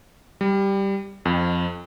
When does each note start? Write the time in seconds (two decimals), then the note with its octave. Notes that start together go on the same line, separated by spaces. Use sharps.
0.41 G3
1.25 F2